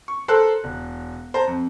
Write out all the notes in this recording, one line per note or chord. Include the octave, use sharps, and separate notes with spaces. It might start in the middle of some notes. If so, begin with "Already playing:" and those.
C#6
A4 A#4 C5 C6 F#6
E1
C5 A5 A#5
F2